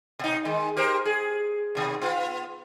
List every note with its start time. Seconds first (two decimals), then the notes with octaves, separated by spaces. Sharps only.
0.19 B2 D#4
0.45 D#3 G#3
0.77 G4 A#4 C5
1.05 G#4
1.75 D#2 B2
2.02 B3 F4